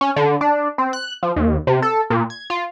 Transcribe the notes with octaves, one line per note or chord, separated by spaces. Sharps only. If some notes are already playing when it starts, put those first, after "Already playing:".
C#4
D3
D4
C4
F#6
F3
D#2
C3
A4
A#2
G#6
F4